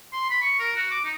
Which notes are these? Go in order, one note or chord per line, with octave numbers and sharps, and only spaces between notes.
C6
B5
C#6
A#4
F#4
D6
D#4